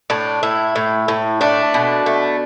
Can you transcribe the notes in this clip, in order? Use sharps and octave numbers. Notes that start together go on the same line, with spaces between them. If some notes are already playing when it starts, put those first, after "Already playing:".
A2 D4
A2 E4
A2
A2
A3 D4
B2
A3